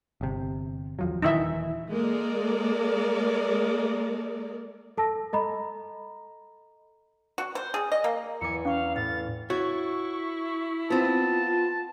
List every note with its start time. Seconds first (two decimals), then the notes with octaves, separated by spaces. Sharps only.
0.21 G1 C3
0.99 E2 F3 F#3
1.22 D#1 D#3 E3 D#4 E4 E5
1.90 G#3 A#3 A4 A#4 D5
4.97 A4 A5 E6 A#6
5.33 A4 D#5 A#5 B5
7.38 F#4
7.55 C5
7.74 G#4
7.92 D#5
8.04 A#3
8.41 E2 G#5 A#5 D6 C#7
8.65 C#4 F5 C#6
8.96 A2 B4 A6
9.50 E4 F#4 C#5 C#6
10.90 B3 C4 F4 A5